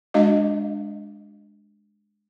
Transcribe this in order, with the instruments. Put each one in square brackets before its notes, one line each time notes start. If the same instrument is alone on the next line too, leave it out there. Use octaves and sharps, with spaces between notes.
[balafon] G#3 D4 F#4 D#5 F5